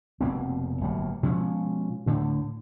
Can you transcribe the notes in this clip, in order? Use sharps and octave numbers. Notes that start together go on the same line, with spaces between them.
F1 B2 A#3 C4
G1 A2 F#3 A#3
B2 F3 G#3 C#4
D2 A2 D3